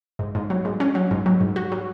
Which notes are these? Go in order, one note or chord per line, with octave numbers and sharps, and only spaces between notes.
G#2
G#2
F#3
G#2
C#4
F#3
G#2
F#3
G#2
F#4
F#3